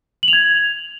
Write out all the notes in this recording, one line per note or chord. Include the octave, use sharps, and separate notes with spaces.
F#7
F7
G#6